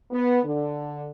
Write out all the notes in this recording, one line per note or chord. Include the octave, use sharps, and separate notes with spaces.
B3
D3